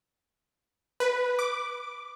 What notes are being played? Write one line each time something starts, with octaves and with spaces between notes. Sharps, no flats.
B4
D6